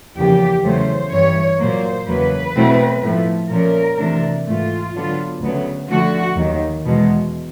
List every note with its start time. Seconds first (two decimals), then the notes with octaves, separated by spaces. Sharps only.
0.16 E2 C#3 F3 A#3 G4
0.64 E2 C#3 F#3 A3 C#4 C5
1.12 G2 E3 G3 C#5
1.60 A#2 F#3 A#3 C5
2.07 E2 C#3 F#3 A#3 B4
2.55 B2 F#3 A3 C4 E4
3.02 A2 F3 A3
3.51 A#2 F3 A3 C#4 A#4
3.98 C3 E3 A3 D4
4.46 G#2 E3 A3 F4
4.94 D3 F#3 B3 D4 F4
5.41 D2 C#3 F#3 B3
5.90 D3 F3 A3 F#4
6.36 D#2 D#3 F#3
6.85 E2 B2 G#3